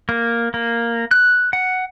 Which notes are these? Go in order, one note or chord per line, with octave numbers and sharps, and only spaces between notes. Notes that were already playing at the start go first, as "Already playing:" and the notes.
A#3
A#3
F#6
F#5